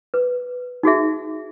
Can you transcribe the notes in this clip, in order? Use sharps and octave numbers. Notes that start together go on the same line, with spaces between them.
B4
D#4 F#4 G#4 E5